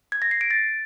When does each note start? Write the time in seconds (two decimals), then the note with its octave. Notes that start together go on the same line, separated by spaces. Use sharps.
0.12 G#6
0.22 A#6
0.31 C7
0.41 D7
0.51 A6